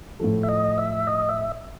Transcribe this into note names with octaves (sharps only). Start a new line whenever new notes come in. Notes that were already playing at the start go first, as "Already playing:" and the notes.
A2 F3 A3
E5
D#5
E5
D#5
E5